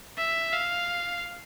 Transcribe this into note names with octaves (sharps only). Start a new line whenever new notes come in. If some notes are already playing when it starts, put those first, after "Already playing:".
E5
F5